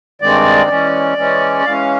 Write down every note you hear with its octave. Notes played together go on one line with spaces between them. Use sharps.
G2 D#3 G#3 C4 D5
E3 G#3 C#4
E3 G#3 C#4
E3 G#3 C#4 F5